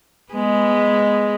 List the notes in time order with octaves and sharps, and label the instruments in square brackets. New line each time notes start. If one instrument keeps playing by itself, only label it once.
[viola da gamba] G#3 B3